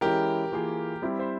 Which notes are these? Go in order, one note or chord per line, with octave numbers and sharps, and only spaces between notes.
E3 G#3 C#4 E4 G4 A#4
E3 A#3 F4 G#4
G3 C4 E4 G4
C5 E5